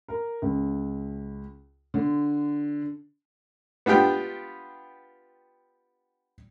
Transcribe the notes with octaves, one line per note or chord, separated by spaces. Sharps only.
A#4
C#2
D3
B3 D4 F4 G4 G5